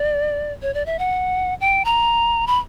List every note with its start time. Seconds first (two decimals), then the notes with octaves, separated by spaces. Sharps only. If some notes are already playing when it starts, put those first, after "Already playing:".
Already playing: D5
0.62 C#5
0.74 D5
0.86 E5
0.99 F#5
1.61 G5
1.85 A#5
2.47 B5